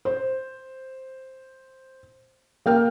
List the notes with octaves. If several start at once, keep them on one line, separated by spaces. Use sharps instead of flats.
C5
A#3 G5 F6